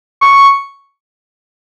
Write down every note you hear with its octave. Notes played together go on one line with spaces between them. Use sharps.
C#6